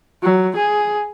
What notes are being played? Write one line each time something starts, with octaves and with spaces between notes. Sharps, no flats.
F#3
G#4